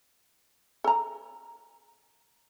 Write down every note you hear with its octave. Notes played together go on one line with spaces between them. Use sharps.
A4 A#5